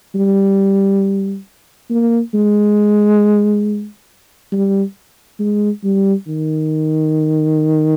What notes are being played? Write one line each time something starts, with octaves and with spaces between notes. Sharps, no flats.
G3
A#3
G#3
G3
G#3
G3
D#3